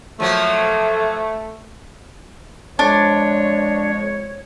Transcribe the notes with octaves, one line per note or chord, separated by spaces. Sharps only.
F3 F#3 A3 A#3
F2 G#3 D4 C#5